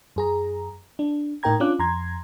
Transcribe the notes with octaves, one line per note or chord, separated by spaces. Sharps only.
F#2 G#4 A#5
D4
A2 D#4 A#4 G5 A#5 G#6
C#4 D4 F4 D6 F#6
F2 A#5 C6 G#6